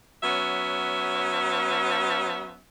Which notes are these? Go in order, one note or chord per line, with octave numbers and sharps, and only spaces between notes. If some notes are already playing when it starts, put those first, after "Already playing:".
F#3 B3 C#4 E5